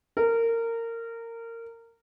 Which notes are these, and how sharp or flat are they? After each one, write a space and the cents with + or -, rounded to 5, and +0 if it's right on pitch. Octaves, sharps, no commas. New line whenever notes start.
A#4 -20